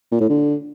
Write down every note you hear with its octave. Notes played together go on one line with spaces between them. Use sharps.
A#2
A2
D3